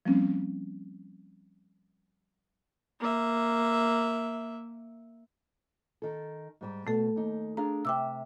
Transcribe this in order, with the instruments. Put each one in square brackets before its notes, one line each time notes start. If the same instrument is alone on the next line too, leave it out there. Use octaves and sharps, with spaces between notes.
[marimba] F3 G3 A#3 C4 C#4
[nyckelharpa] A#3 E5
[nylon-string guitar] D#3 A4
G#2 G3 A5
[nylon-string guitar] B2 [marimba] A3 A4
[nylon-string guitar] D#2 D#4
[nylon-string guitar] D4 G#4 F5 [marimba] A#5
[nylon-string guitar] C3 E5 [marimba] G5 D6 E6